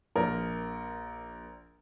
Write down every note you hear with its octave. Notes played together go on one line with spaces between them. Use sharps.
A#1 A#4